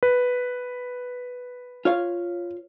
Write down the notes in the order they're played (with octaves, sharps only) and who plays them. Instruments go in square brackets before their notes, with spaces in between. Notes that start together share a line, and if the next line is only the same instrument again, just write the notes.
[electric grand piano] B4
[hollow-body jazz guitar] F4 C#5 F5